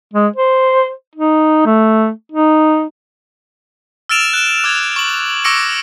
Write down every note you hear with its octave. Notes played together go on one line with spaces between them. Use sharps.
G#3
C5
D#4
A3
D#4
E6 F6 A6 D7 E7 F7
F#6 E7
D6 E6 G#6
C#6 F#7
C#6 D6 E6 A#6 C#7 D7